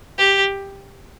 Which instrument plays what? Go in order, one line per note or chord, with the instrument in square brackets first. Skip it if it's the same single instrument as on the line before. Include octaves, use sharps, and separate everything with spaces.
[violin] G4